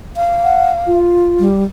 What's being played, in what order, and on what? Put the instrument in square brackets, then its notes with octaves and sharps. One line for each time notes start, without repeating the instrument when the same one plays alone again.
[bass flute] F5
[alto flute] F#5
F4
[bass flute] G3